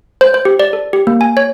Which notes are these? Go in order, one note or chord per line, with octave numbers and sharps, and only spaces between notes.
C5
C5
G4
D5
A4
G4
A#3
G#5
C#5